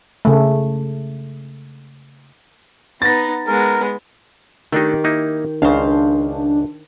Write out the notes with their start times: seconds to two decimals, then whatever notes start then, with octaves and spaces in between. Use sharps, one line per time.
0.25 C#3 A3
3.02 B3 D#4 A6 A#6
3.47 G#3 B3 A#4
4.72 D#3 A3 D4 D#4 G4
5.04 A#3 D#4 E4
5.62 C#2 C#3 D4 C5 F5